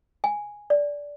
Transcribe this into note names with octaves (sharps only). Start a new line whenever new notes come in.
G#5
D5